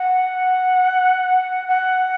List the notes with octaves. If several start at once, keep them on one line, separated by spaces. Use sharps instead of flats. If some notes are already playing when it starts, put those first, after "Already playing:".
Already playing: F#5
F#5